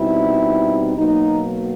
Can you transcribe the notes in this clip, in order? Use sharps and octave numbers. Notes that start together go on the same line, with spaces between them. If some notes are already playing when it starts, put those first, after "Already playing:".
Already playing: B2 G3 C4 D#4 E4
B2 F#3 A#3 D#4